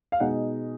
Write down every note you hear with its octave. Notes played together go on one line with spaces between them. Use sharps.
F5
B2 G#3 D#4 F#5